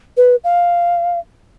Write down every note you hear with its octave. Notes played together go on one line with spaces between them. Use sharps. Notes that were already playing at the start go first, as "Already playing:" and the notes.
B4
F5